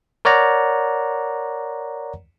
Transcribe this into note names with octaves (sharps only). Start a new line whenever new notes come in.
A#4 C#5 D5 F#5 A#5